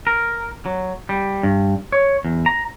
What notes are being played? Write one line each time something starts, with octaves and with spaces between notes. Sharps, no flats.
A#4
F#3
G3
G2
C#5
E2
A#5